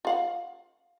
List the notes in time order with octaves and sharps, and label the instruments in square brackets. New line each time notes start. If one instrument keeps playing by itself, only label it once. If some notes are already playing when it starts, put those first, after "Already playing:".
[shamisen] F4 F5 F#5